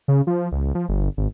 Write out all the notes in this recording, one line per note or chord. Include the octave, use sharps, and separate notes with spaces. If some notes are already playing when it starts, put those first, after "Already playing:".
C#3
F3
C#2
F3
G1
G#1